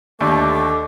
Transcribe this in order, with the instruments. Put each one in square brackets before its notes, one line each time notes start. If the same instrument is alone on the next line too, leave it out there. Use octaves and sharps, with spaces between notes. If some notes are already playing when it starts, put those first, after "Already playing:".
[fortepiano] D#2 [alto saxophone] D3 [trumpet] A3 [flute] D6